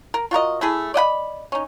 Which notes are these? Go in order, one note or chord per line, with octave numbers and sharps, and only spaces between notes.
A#4
F4 F#4 A#4 D#5
A3 E4 G#4 A4
D5 D#5 F#5 B5
C#4 D#4